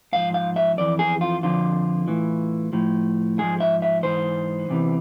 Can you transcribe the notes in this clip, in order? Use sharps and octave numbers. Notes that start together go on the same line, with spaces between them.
G#2 F3 F5
F5
E5
F2 E3 D5
G#4
F4
F2 D3 F3 F4
A2 E3
A2 F3
G#2 F3 G#4
E5
E5
G#2 E3 C5
E2 C3 E3